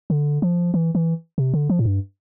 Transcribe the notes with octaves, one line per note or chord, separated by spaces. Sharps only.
D3
F3
E3
E3
C3
D3
F3
A2
G2